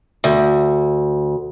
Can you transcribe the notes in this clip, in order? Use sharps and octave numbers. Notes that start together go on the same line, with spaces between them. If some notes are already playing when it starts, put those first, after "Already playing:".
D2